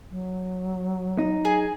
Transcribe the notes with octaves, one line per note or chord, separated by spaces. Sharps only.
F#3
D#4
G#4